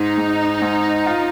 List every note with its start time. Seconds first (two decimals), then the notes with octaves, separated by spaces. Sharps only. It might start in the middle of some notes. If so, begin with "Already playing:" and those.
Already playing: G#2 G#3 D#4
0.18 G#2
0.62 G#2
1.06 F4